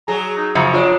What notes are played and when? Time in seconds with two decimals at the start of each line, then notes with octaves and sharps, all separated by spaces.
0.08 F#3 G#4 A#5
0.37 D#4
0.55 F#2 C#3 F3 A#5
0.74 D4 F4 C#5